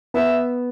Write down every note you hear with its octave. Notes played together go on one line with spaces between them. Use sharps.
B3 E5